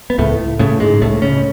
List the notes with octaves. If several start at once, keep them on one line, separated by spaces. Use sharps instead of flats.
B3
C#2 A2 A3
A2 C#3 A3
G#2 G#3
C#2 A2 A3
C#3 C#4